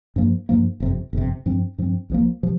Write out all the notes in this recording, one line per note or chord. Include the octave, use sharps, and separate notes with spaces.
G2 F3 A#3
G2 F3 A#3
G1 F2 C3
G1 F2 C3
G2 F3 C4
G2 F3 C4
C2 C3 F3 A#3
C3 F3